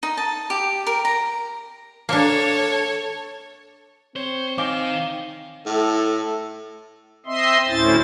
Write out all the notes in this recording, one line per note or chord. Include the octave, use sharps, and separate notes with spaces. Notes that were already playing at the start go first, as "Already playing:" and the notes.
D#4
A5
G4
A#4
A#5
A#3 D4 A4 C#5
C4 C5 C#5
D#3 D#4 F5 G#5 D6
A2 A4
C4 D#5 E5 C6
D2 A2 C#4 E4 C5 A6